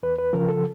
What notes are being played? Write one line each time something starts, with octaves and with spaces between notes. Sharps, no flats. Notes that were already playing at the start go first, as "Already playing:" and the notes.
E2 B4
B4
C#3 F3 A#4
A4